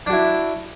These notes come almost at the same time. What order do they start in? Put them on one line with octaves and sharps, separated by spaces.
D4 F#4 E4